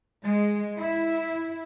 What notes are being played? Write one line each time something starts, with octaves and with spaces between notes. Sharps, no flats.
G#3
E4